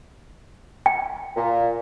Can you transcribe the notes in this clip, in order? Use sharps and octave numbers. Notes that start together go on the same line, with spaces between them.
G5
A#2